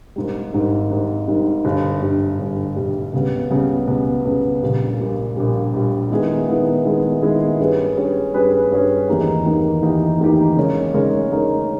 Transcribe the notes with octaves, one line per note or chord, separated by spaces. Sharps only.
G#1 G#2 G3
G#1 G#2 G3
G#1 G#2 G3
G#1 G#2 G3
G1 G2 G3
G1 G2 G3
G1 G2 G3
G1 G2 G3
C#2 C#3 G3 B3
C#2 C#3 G3 B3
C#2 C#3 G3 B3
C#2 C#3 G3 B3
A#1 A#2 G3
A#1 A#2 G3
A#1 A#2 G3
A#1 A#2 G3
D#3 G#3 B3 E4 G#4
D#3 G#3 B3 E4 G#4
D#3 G#3 B3 E4 G#4
D#3 G#3 B3 E4 G#4
G2 G3 C#4 G#4 B4
G2 G3 C#4 G#4 B4
G2 G3 C#4 G#4 B4
G2 G3 C#4 G#4 B4
E2 D#3 A#3 D#4 G4
E2 D#3 A#3 D#4 G4
E2 D#3 A#3 D#4 G4
E2 D#3 A#3 D#4 G4
C#3 G#3 D#4 A#4 C#5
C#3 G#3 D#4 A#4 C#5
C#3 G#3 D#4 A#4 C#5